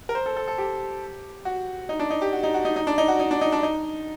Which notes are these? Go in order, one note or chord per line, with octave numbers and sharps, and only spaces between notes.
A#4
C5
A4
A4
A4
G4
F#4
D#4
D4
D#4
G4
F#4
D#4
F#4
D#4
D#4
D4
D#4
F#4
D#4
D4
D#4
D4
D#4